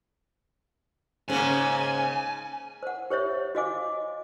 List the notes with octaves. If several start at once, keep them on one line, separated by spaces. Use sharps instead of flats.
G#2 C#3 A#3 G#5
C5 F#5
G4 C5 C#5 E5
F#4 C5 D#5 F5 G#5 D6